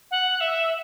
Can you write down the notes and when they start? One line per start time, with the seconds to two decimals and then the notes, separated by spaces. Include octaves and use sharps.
0.11 F#5
0.40 E5